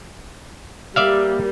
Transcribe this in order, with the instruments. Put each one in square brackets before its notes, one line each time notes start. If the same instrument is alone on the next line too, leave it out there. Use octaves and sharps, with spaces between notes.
[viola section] G3 A#3 [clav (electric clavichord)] D5 E5 F5